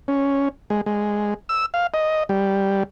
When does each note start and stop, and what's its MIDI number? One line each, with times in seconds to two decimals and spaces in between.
0.08 0.49 61
0.70 0.81 56
0.86 1.34 56
1.49 1.66 88
1.74 1.87 77
1.94 2.23 75
2.29 2.83 55